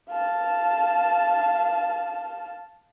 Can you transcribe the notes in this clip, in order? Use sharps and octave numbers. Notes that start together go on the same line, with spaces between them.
F5 A5